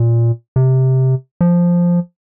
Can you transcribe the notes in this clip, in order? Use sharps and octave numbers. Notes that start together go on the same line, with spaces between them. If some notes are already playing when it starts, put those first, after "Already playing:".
Already playing: A#2
C3
F3